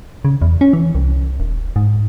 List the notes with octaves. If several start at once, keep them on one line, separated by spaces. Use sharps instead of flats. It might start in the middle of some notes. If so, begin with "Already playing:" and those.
C#3
E2
C#4
E3
C2
D#1
G#2